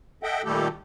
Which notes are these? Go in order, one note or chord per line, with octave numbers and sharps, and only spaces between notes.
A4 D#5 E5 F#5 G5
A#2 D#3 G3 A3 G4 A4